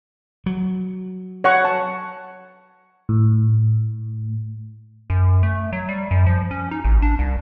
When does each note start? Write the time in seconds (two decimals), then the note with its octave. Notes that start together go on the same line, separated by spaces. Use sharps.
0.46 F#3
1.44 C#5 F#5 C#6
1.65 A5
3.09 A2
5.10 F#2
5.43 A3
5.73 F#3
5.89 G3
6.11 F#2
6.26 F3
6.51 C#4
6.71 D#4
6.84 A1
7.02 D4
7.19 C2